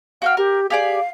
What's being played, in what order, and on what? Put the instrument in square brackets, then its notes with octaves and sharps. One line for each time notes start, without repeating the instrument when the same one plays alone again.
[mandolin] F#4 G5 F6 [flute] F5
[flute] G4 [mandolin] A#4
[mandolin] G4 G#4 D5 [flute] F5